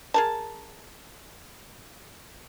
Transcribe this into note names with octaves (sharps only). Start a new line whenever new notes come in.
G#4 A#4 A5